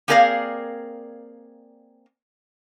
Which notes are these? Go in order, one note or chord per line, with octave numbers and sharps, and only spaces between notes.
A#3 C4 G#4 A#4 D5 F5